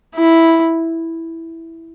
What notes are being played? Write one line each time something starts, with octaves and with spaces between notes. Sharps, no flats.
E4